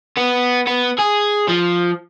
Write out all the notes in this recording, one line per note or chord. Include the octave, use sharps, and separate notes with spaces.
B3
B3
G#4
F3